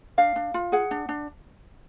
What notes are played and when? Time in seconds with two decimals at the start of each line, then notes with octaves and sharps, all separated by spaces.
0.18 D4 F5
0.36 D4
0.54 F4
0.72 G#4 F#5
0.91 D4
1.09 D4